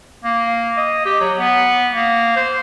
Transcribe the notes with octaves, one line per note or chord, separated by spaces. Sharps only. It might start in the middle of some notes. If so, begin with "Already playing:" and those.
A#3
D#5
G4
F#3
B3
A#3
C5